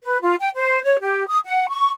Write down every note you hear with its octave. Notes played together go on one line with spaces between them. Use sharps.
B4
F4
G5
C5
C#5
G4
D#6
F#5
C#6